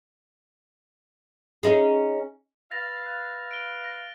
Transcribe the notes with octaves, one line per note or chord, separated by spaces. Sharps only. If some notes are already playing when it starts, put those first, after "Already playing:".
C#4 D#4 G#4
B4 E5 F5 A6 A#6 F7
F#6 A6
D7 G7
A#6